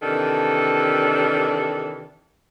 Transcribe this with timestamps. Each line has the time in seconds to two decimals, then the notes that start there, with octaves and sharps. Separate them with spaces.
0.03 C3 D#3 E3 D4 A4